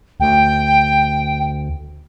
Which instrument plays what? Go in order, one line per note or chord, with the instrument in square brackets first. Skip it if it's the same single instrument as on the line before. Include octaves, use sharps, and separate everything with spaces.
[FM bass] D2 [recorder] G5